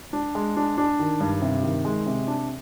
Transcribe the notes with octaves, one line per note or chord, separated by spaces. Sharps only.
D4
G#3
D4
D4
D#3
G2
C3
D#3
G#3
C3
D4